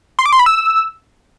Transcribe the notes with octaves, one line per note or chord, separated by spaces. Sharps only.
C6
D6
C6
B5
E6